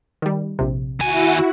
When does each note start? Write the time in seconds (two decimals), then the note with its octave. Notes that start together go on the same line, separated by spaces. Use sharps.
0.22 D#3 G3
0.59 A#1 C3
1.00 D#2 E4 F#4 G#5